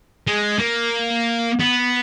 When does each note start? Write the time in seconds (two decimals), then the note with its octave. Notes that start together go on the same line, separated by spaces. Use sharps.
0.27 G#3
0.60 A#3
1.59 B3